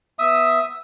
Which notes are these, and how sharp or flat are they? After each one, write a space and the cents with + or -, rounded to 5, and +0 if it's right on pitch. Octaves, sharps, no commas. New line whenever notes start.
B3 +0 E5 +0 D#6 +10